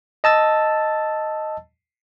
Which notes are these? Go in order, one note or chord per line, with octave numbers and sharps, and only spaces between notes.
D#5 A5 E6 A6